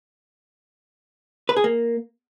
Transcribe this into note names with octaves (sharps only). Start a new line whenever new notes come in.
B4
G#4
A#3